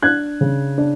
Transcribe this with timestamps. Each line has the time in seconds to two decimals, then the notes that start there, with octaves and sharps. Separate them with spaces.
0.02 D4 F#6 G#6
0.41 C#3
0.78 D4